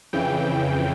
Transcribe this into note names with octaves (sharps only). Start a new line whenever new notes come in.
F2 C#3 E3 G5